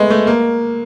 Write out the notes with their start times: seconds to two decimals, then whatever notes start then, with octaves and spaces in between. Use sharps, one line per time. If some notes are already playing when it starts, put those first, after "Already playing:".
Already playing: G#3 A3 B3
0.10 A3
0.27 A#3